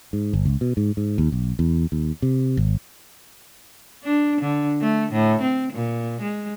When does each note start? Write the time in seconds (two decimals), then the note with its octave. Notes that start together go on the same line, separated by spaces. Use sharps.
0.13 G#2
0.33 G1
0.45 C#2
0.61 B2
0.77 G#2
0.97 G#2
1.18 D#2
1.32 B1
1.59 E2
1.92 D#2
2.22 C3
2.57 G#1
4.04 D4
4.41 D3
4.81 A3
5.12 A2
5.42 C4
5.73 A#2
6.22 G#3